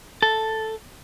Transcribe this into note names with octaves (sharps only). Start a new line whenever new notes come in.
A4